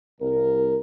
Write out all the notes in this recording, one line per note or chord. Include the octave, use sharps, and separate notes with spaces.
C2 A#4